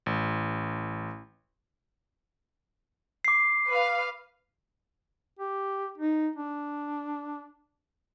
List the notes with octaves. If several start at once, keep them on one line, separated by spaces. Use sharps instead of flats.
A1
D6 C7
B4 F5
G4
D#4
D4